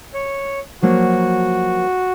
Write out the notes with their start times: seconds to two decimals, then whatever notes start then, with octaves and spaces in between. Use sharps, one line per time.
0.14 C#5
0.82 F3 F#3 A#3 F#4